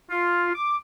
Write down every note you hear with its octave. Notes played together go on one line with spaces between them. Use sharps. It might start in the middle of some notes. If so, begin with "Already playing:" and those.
F4
D6